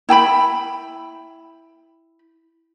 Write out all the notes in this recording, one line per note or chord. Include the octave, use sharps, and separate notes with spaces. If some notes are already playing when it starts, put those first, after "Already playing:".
E4 G5 A5 B5